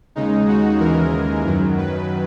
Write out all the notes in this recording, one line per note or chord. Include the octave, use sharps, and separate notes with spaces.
D#2 C#3 G#3 D#4
F#4
D#2 C#3 E3 G#3 A#4
F#2 D#3 F#3
B4